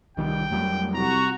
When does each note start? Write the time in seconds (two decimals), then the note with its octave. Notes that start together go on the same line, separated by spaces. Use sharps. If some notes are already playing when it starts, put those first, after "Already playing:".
0.17 C2 D#3 G3 G5
0.51 F2 F#3 G3 A3
0.94 C2 F#4 A#5